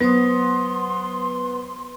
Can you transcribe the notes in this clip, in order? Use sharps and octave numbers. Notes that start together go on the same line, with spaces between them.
F#3 B3 C5 C6 D#6